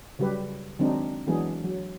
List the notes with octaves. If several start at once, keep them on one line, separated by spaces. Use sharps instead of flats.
C#3 F#3 G3 G4 B4
D#3 F#3 G#3 C4 D4 D#4
E3 F#3 G#3 B3 D4 G#4
F#3